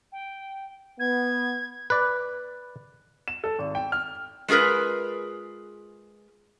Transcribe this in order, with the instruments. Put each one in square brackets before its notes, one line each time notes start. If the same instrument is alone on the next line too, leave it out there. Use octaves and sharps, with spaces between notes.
[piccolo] G5
[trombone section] B3 [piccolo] G#6
[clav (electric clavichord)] B4 D5
[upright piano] E7
A4
G#1
G5
F6
[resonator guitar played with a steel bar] G#3 F4 G#4 A#4 B4